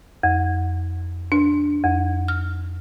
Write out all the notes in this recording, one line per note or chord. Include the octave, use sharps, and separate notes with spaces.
F2
D4
F2
F6